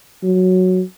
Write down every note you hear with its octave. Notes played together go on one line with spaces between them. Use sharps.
F#3